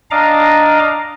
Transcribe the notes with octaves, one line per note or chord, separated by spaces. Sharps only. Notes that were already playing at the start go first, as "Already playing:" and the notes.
D4 D#5 F5 A#5 D6